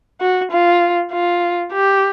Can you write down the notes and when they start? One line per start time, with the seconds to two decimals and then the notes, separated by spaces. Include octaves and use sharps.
0.21 F#4
0.51 F4
1.12 F4
1.73 G4